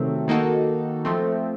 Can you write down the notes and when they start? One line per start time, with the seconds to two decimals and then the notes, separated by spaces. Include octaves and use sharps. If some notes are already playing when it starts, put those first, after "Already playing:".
Already playing: C3 D#3 F#3 A3 C4
0.28 D#3 A#3 D#4 F#4 A4
1.05 F3 A3 C4